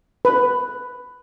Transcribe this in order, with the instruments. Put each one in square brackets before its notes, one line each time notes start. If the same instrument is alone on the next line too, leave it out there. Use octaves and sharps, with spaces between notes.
[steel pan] B4